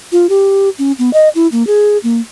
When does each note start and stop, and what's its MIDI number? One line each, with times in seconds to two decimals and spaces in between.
0.12 0.27 65
0.29 0.69 67
0.79 0.92 61
0.99 1.12 59
1.13 1.29 75
1.35 1.47 64
1.52 1.66 58
1.67 1.98 68
2.03 2.20 58